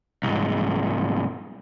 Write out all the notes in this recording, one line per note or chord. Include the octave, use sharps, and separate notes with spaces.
C2 G#2